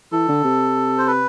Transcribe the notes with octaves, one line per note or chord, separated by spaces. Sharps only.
E3 A4
D3
C3
C5
B4